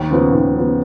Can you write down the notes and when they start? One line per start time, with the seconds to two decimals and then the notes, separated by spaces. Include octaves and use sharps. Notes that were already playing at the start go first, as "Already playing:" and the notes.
Already playing: D#2
0.11 C#3 F3 B3
0.33 D#2
0.55 C#3 F3 B3